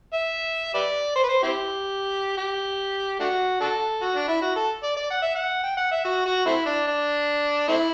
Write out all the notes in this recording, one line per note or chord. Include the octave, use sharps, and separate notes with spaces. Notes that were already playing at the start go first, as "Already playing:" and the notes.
E5
G4 B4 D5
C5
B4
C5
C4 E4 G4
G4
A3 D4 F#4
D4 F#4 A4
F#4
D4
E4
F#4
A4
D5
D5
F#5
E5
F#5
G5
F#5
E5
F#4
F#4
A3 C4 E4
D4
D4
A3 C4 E4